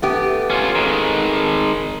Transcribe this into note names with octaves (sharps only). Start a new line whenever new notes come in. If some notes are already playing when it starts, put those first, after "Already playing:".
A3 B3 G4
C#4 F4
D#3 G#3